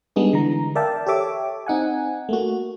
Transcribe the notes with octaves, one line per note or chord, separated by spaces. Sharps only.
G3 G#3 B3 D4 D#4 G#4
D3 E3 A#5
A#4 D5 E5 F5 G5 A5
G4 A4 C#5 E5 D6
C4 D#4 F#5 G#5
A3 A#3 F#4